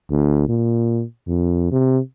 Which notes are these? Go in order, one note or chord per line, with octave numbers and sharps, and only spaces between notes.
D2
A#2
F2
C3